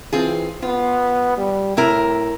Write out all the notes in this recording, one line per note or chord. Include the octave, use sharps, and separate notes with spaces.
E3 C4 F4 G#4
B3 F4
G3
A2 C3 E4 A#4